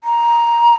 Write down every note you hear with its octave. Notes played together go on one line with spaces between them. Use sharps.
A#5